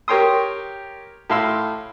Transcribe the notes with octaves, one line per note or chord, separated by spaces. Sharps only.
G4 A#4 C#5 G5 C6 D#6
A2 E4 F5 C6 E6